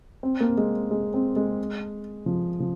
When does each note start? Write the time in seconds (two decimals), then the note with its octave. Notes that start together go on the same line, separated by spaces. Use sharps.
0.23 C4
0.40 A#3
0.57 G#3
0.91 G#3
1.14 C4
1.36 G#3
2.26 F3
2.60 F3